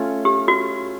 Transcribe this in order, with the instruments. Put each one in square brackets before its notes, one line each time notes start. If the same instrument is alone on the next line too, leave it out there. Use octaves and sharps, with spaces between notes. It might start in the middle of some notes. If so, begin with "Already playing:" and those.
Already playing: [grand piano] A3 C#4 F4
[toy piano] G4
F#4